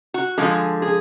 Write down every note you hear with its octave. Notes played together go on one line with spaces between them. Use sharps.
F#4
D3 F3 G#3 G#4
G#4